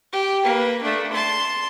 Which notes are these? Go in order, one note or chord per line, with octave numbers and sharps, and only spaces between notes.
G4
A#3 B4
A3 D4
A5 C6